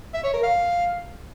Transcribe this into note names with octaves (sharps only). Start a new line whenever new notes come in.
E5
C#5
A#4
F5